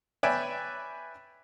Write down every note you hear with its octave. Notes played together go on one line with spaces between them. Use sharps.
B4 C#5 D5 E5 G5 G#5